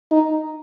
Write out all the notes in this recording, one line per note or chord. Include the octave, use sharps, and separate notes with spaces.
D#4